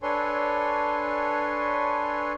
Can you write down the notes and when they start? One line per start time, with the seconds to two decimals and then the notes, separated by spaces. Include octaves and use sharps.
0.02 D4 A4 B4 C#5 G#5 C6